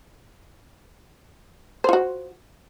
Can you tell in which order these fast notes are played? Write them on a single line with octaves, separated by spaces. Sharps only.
C5 F4 F#4